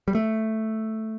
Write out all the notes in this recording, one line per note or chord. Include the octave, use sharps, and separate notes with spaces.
G3
A3